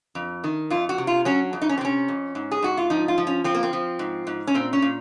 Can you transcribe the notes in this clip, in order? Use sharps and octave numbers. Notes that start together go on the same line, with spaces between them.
F2
D#3
F2 F4
F#4
C3
F4
F#3 C#4
F2
D#4
C#4
C4
C3 C#4
F2
G#2
G#4
G#2 F#4
F4
F3 D#4
F4
F3
C#4
F3 C4
A#3
C4
F3
G#2
G#2
C#4
A#2 C4
C#4
A#2